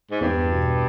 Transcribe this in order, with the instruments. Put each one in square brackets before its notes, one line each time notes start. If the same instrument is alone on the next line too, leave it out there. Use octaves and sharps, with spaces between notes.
[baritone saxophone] G#2
[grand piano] E2 [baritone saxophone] G2
[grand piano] B2